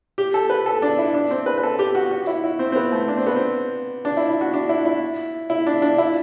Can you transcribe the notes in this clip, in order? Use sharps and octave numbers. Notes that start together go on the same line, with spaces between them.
G4
A4
B4
A4
D4
E4
D4
C4
B4
B4
A4
G4
F#4
F#4
E4
E4
C4
C4
B3
A3
D4
C4
B3
C4
D4
E4
E4
F#4
D4
E4
E4
E4
D4
D4
E4